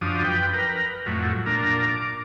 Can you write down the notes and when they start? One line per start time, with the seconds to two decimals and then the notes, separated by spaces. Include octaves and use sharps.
0.01 F#2 F3 D4 D#6
0.24 B4 G5
0.53 A#4 B4
1.06 F2 A2 F#3
1.46 A#2 D4 A#4
1.89 D6